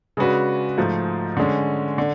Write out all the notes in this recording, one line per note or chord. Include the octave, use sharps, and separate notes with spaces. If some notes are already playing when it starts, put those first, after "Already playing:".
C#3 G#3 D4 F#4 B4
G#2 F3 A3
D3 G#3 C#4
D3